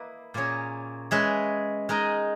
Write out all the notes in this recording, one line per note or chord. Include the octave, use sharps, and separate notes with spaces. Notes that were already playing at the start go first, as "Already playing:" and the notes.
Already playing: A#3 E4 B4 D#5
A#2 A#3 C#4 G#4 C#5
G#3 C#4 G#4 B4 E5
G#3 D#4 A#4 D#5